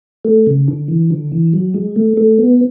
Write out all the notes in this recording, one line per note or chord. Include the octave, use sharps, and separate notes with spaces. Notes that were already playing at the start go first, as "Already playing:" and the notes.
A3
C#3
D3
E3
D3
E3
F#3
G#3
A3
A3
B3